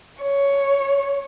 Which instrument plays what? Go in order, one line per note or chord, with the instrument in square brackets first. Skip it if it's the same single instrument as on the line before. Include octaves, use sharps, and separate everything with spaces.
[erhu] C#5